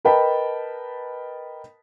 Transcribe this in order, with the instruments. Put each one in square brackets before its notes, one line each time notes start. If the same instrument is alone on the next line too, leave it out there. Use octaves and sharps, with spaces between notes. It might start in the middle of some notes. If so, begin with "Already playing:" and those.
[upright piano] A#4 B4 D#5 G5 A5 B5